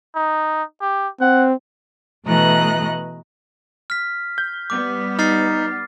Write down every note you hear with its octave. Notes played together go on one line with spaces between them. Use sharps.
D#4
G4
C4 F#5
B2 E3 A3 D#5 A#5 F#6
F6 B6
G6
G3 B3 D6
D#4 F6 A6 C7